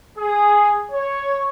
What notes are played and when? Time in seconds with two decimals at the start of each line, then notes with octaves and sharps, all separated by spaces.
0.18 G#4
0.92 C#5